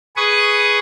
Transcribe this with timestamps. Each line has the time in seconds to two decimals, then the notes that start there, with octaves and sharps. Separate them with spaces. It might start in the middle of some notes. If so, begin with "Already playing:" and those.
0.16 G#4 B4 C#6 D#6